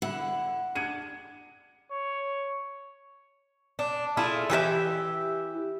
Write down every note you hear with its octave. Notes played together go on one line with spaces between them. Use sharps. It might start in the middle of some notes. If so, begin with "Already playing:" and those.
D3 E4 F#5
D4 G#6 C#7 D#7
C#5
D4
E4 F4 G#4 A4
E3 G4 G#4 E5